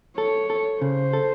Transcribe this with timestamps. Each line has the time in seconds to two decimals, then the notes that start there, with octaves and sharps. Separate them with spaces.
0.17 A4 C#5
0.50 A4
0.81 C#3 C5
1.13 A4